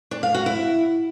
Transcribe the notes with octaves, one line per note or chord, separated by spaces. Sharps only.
D4
F5
F#4
E4